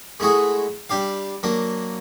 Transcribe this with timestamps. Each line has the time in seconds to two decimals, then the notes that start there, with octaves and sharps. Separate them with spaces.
0.20 G#3 A3 E4 F#4 G#4
0.89 G3 D4 G4 F5
1.43 F#3 A#3 D4